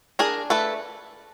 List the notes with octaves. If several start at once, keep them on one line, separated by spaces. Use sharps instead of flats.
D4 G#4 A#4
A3 A4 B4